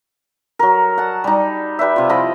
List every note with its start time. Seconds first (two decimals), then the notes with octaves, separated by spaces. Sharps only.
0.59 F#3 A#4
0.98 F#5 A5
1.24 G3 D#4
1.79 G4 B4 D5 E5
1.96 C3 F4
2.09 F3 E4 D#5 B5